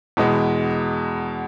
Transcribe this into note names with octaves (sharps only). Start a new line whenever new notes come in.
E2 B2 G#3